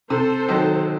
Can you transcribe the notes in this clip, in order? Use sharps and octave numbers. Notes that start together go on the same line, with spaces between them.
C3 A4 C5
D#3 F#3